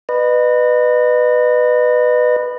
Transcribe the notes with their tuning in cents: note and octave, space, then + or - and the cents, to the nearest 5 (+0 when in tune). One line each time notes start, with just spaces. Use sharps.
B4 +0 D#5 -35